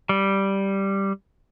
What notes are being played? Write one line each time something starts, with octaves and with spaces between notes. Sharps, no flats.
G3